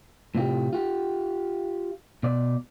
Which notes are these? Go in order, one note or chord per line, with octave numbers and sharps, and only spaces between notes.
A2 C3 F4 G4
F4 G4
B2 D5